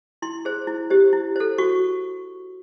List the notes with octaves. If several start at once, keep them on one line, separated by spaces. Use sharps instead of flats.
E4 C6
G#4 C5
E4
G4 C5
E4
A4 C5
F#4 C#6